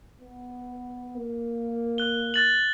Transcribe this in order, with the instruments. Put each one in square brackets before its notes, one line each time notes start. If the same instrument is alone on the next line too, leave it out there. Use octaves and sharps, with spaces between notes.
[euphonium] B3
A#3
[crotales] F#6 G7
F#6 A6 F#7